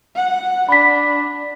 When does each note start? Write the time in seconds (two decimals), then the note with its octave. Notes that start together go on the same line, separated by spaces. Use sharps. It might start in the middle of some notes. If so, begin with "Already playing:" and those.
0.15 F#5
0.69 D4 B5 B6